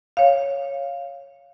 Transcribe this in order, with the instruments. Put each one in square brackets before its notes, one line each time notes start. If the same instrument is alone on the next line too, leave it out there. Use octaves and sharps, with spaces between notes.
[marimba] C#5 F5